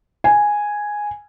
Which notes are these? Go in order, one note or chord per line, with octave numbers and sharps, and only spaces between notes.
G#5